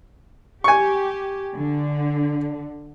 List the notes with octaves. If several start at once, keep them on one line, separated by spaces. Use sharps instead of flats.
G4 G#5 C#6
D3